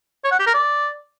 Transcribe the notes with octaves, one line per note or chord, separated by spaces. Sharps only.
C#5
F#5
G4
A#4
D5